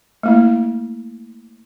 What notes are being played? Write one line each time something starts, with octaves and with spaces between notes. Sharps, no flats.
A3 A#3 E4